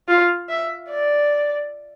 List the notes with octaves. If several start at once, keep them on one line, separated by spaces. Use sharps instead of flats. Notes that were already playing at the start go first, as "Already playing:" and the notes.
F4
E5
D5